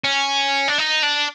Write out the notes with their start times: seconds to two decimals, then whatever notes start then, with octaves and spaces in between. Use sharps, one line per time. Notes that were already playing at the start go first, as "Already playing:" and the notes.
0.04 C#4
0.68 D4
0.78 D#4
1.03 D4